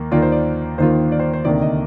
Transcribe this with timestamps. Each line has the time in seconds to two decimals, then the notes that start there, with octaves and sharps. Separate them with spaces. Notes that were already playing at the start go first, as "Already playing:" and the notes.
Already playing: D#2 A#3
0.12 D#2 D#3 A#3 F4 D5
0.22 C5
0.32 D5
0.78 D#2 D#3 A#3 F4 C5
1.12 D5
1.20 C5
1.33 C5
1.45 D2 C3 D#3 A#3 D5
1.62 D#5